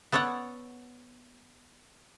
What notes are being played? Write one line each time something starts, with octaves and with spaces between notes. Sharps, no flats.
B3 A4 C#5 D5 F#5